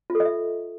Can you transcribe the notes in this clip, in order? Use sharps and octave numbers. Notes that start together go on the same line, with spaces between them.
F4
A4
D#5
E5